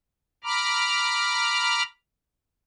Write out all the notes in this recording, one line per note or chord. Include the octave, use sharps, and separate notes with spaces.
A#5 B5 D6 F6